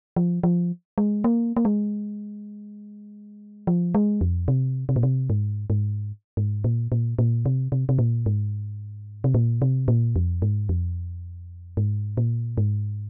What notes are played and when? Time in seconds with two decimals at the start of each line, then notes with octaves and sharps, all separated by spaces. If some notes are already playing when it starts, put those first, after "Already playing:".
0.16 F3
0.43 F3
0.98 G#3
1.24 A#3
1.57 A#3
1.65 G#3
3.67 F3
3.95 G#3
4.21 F2
4.48 C3
4.89 C3
4.96 A#2
5.03 C3
5.30 G#2
5.70 G#2
6.37 G#2
6.64 A#2
6.92 A#2
7.19 A#2
7.46 C3
7.72 C3
7.89 C3
7.99 A#2
8.26 G#2
9.24 C3
9.34 A#2
9.62 C3
9.88 A#2
10.16 F2
10.42 G#2
10.69 F2
11.77 G#2
12.17 A#2
12.58 G#2